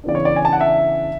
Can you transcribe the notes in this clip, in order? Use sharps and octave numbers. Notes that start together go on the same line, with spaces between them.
C#3 E3 B3 D4 D5
C#5
D5
G#5
A5
F#5
E5